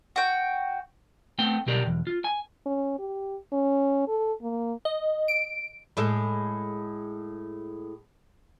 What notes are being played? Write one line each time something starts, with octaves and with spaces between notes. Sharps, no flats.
F#4 G5
A3 B3 C4 G5
B1 B2 G4 A#4 D5
B1 E2
F4
G#5
C#4
G4
C#4
A4
A#3
D#5
D7
A2 G#3 A4